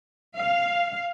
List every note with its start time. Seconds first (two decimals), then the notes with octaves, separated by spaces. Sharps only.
0.38 F5